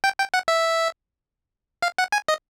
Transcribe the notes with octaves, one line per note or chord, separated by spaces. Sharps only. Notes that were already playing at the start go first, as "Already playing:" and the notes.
G5
G5
F#5
E5
F5
F#5
G#5
D#5